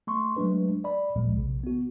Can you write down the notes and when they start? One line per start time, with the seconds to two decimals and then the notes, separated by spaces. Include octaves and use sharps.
0.07 A3 C6 C#6
0.36 F#3 G#3 A3 D4 B4
0.84 D5 B5
1.15 G#1 D2 A#2 F3 G#3
1.36 A#1 C3
1.63 B3 F#4